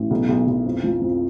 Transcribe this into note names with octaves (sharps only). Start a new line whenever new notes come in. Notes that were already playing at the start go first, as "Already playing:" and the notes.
Already playing: A1
B1
B1
B1
F2
F3
F2